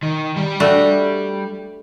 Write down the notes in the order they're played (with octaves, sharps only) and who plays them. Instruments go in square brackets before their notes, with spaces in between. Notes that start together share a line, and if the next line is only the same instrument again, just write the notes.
[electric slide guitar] D#3
G3 G4
[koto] A3 D4 F#4